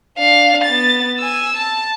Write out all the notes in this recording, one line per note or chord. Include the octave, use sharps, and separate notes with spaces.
D4 F5
B3 A6
G#5 E6
A5